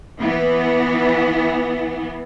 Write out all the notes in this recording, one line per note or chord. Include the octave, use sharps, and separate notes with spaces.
E3 B3